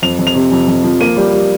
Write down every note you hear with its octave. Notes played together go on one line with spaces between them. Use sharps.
F2 F7
F2
F7
C3
F2
F2
F3
A#3 D#7
G3
G3